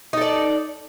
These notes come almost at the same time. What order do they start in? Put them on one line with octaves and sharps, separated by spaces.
D#4 A4 D5